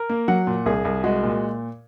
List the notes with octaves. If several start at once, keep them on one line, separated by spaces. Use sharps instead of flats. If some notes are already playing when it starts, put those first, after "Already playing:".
Already playing: A#4
A#3
F#3 F#5
A#2
C2 G#4
C2
G#3 F#4
A#2